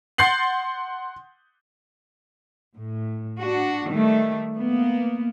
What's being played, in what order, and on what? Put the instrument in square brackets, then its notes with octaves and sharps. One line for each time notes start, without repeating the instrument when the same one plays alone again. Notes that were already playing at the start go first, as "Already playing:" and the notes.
[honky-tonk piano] F#5 C6 G6 A6 C7 F#7
[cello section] A2
D4 F#4
D#3 G3 A3
A#3 B3